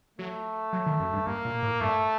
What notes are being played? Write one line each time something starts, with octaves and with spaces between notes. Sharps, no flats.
F#3 A3
F#3
D#3
F#2
G2
G2 A#3
A#2
A2
G2 A3